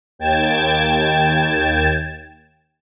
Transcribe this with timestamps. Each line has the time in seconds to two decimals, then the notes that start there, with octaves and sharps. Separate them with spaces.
0.19 D#2 G5 G#6 A6 E7